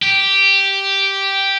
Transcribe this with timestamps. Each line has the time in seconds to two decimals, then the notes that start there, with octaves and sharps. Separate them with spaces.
0.02 G4